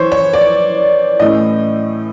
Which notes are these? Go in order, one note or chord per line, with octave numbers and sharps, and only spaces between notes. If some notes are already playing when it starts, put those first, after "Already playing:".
Already playing: E3 C5 C#5
C#5
D5
A2 E3 A3 C#4 D#5